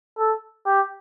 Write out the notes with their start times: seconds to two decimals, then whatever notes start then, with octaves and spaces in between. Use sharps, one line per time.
0.18 A4
0.66 G4